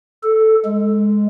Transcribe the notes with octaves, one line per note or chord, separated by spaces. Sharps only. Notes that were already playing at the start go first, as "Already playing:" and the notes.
A4
G#3